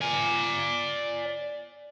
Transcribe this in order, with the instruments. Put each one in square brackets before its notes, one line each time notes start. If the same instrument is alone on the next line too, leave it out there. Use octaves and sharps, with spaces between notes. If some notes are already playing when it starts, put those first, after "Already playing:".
[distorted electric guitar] D5 G#5